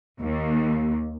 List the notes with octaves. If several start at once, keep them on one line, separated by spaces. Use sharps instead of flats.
D#2